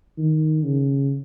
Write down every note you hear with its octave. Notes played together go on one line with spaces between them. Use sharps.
D#3
C#3